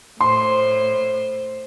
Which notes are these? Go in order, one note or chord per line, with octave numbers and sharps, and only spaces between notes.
A2 C5 C6